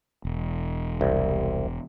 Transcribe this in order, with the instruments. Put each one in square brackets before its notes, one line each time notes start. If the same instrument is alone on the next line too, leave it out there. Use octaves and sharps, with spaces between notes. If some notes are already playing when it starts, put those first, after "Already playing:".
[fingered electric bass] E1
[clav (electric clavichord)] C2